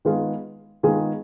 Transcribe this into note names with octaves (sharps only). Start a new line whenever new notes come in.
D#3 G#3 B3 F4 G#4
D#3 G#3 B3 F4 G#4